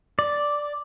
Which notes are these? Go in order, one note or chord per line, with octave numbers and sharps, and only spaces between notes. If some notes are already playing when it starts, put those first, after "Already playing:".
D5